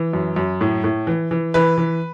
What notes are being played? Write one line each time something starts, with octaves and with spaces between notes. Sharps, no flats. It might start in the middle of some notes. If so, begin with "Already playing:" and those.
Already playing: E3
F#2
F#2
A2
A2
E3
E3
E3 B4
E3